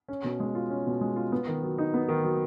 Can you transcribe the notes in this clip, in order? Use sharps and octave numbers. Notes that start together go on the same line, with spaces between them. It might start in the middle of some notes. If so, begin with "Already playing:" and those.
C#4
B2
G#3
F4
C#4
B2
G#3
F4
B3
D#3
F#3
D#4
B3
D#3
F#3